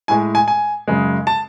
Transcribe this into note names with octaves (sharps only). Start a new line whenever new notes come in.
A2 G#3 G#5
G#5
G#5
F#2 C#3 G#3
A5